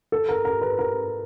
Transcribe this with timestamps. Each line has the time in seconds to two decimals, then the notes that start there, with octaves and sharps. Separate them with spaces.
0.12 A4
0.29 A#4
0.45 A#4
0.62 B4
0.79 A#4